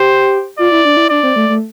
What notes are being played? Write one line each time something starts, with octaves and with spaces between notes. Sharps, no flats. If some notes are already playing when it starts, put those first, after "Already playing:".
Already playing: G4 C5
F4 D5
E4
D4
E4
D4 D5
C4
A3
A3